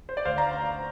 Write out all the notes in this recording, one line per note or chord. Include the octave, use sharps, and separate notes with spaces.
C5
D5
D2 C5 F5
F5 A#5